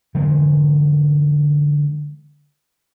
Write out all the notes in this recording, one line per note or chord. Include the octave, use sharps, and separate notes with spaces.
D3 E3 F3 G#3